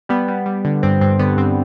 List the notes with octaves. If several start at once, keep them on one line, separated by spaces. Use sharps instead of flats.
G3 B3
G3
G3
D3
G2 C4
G2 C4
D3 B3
G2 C4